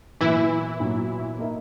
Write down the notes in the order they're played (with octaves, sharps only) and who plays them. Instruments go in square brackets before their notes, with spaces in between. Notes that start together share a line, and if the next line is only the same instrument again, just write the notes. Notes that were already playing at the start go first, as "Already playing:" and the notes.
[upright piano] A#2 F#3 B3 F#4 B4 [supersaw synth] E3 E4
[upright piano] A#2 F#3 B3 F#4 B4
A#3 D#4 A#4 E5